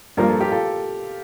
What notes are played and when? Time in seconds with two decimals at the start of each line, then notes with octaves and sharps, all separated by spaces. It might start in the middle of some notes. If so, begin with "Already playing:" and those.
0.17 G2 F3 A#3 A#4
0.29 A4
0.40 G4
0.51 F4 A4